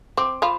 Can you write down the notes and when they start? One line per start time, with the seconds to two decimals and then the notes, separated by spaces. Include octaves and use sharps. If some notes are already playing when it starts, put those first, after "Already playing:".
0.17 C4 D6
0.42 F3 F4 B5